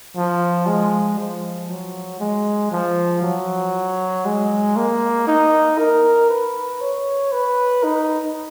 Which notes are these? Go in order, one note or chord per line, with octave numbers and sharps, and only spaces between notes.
F3
G#3
F3
F#3
G#3
F3
F#3
G#3
A#3
D#4
A#4
B4
C#5
B4
D#4